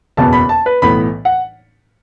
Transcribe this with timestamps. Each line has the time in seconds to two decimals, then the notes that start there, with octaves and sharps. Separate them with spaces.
0.17 F#1 E2 B2 B3 A5
0.33 B5
0.49 A5
0.66 B4
0.82 B1 A2 E3 B3 B5
1.25 F#5